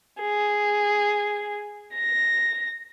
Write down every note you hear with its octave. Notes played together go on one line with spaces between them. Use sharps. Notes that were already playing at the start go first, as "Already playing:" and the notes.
G#4
A#6